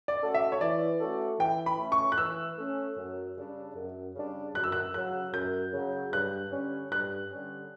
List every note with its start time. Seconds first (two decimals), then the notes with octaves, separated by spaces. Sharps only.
0.08 D5
0.21 A3 C#4 F#4 A4
0.34 E5
0.52 C#5
0.61 E3 D5
1.00 A3 C#4 F#4 A4
1.39 E3 G5
1.66 B5
1.79 A3 C#4
1.92 C#6
2.12 F#6
2.18 E3 E6
2.58 A3 C#4
2.97 F#2
3.37 C#3 G3 D4
3.76 F#2
4.15 C#3 G3 D4
4.54 F#2 F#6
4.64 E6
4.72 F#6
4.94 C#3 F#3 F#6
5.34 F#2 G6
5.73 C#3 F#3
6.12 G2 F#6
6.52 D3 G3 C#4
6.92 G2 F#6
7.31 D3 G3 C#4